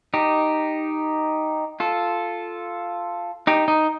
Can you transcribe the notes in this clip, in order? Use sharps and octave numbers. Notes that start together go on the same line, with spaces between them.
D#4 G4
F4 A4
D#4 G4
D#4